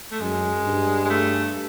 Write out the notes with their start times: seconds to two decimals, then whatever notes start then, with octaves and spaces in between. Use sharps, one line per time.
0.12 A3
0.21 F#2 G#3
0.65 G2
1.05 G#3
1.10 A3